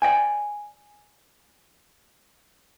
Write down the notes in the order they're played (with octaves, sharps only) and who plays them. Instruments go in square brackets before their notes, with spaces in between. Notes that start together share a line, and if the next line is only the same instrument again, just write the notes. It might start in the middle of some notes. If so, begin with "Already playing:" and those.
[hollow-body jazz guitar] D5 D#5 G5 G#5